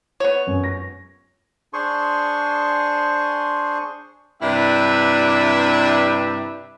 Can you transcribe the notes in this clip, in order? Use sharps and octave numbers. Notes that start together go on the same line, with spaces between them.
B3 C#5
F#2
A#6
D4 G#4 C5 G#5 C6 C#6
G2 C3 D4 E4 B4 E5